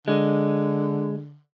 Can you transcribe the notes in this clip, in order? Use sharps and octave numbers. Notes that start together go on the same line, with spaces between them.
D3 G#3